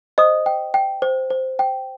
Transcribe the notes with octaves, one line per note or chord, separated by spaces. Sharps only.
C5 D#5 D#6
G5
G5
C5
C5
G5